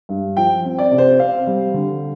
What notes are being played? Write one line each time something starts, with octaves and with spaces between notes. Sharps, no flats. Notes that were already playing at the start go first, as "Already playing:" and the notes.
G2
F3 G5
C4
D5
C3
C5
C4 F5
G3
D3